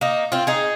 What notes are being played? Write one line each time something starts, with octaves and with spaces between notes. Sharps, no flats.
A#3 D#4
C4 F4
D#4 G#4